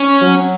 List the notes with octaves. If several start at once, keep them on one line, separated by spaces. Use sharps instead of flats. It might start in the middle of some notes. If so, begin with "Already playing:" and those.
Already playing: C#4
F#3